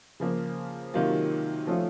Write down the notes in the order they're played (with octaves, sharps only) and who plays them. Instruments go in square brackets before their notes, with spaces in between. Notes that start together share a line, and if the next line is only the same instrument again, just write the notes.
[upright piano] C#3 F3 A#3
C3 D#3 F#3 A#3 F4
F3 A3 C#4 F4